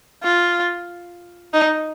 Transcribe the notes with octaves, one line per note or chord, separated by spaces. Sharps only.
F4
D#4